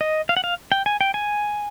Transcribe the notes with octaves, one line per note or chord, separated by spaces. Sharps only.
D#5
F5
F#5
F5
G5
G#5
G5
G#5